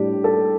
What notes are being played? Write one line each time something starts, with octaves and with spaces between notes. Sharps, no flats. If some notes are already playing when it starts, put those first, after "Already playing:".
Already playing: A2 G3 D4 G4
A4